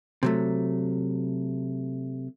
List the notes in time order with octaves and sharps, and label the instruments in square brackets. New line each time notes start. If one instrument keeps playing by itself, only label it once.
[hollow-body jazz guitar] C3 F#3 A3